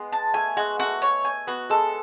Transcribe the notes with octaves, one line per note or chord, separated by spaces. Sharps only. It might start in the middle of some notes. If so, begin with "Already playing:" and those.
Already playing: G#3 B3
A5
A3 G#5
G#3 F#4
A3 F#4
C#5
G#5
B3 F#4
G#3 A4